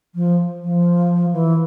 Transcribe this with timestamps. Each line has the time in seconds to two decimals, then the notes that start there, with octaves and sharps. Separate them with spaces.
0.15 F3
0.62 F3
1.33 E3